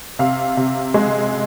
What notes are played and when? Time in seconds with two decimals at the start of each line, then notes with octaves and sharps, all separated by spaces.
0.19 C3 F5
0.57 C3
0.94 G#3